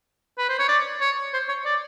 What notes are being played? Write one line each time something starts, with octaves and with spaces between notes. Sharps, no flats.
B4
C5
C#5
D5
C#5
C5
C#5
D5